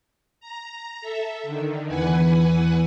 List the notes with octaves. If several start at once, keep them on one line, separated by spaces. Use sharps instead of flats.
A#5
A4 E5
D3 D#3
E2 E3 B4 F#5 G#5